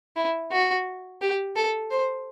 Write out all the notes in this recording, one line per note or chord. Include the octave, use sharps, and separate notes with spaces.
E4
F#4
G4
A4
C5